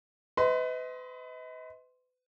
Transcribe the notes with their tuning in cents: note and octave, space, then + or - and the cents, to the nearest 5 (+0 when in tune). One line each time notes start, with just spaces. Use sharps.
B4 +35 D#5 +35 C6 +0